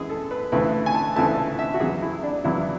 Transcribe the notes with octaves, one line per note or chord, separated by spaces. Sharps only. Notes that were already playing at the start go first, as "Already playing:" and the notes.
Already playing: F#2 E3 G#3 G#4
A4
B4
D2 C#3 E3 A3 B4
G#5
A5
D2 C#3 E3 A3 A5
E5
F#4
E2 C#3 F#3 G#4
E4
D4
E2 C#3 F#3 E4